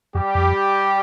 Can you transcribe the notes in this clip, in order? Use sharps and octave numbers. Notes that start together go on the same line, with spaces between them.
F2 G3 G4
F2